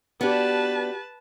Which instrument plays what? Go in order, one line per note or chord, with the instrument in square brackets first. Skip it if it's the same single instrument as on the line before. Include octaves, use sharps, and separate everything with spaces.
[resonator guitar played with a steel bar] B3 D4 [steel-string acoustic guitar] F#4 G4 [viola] B4 A5